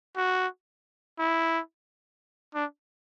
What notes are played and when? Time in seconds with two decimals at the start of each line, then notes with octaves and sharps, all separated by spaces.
0.17 F#4
1.19 E4
2.55 D4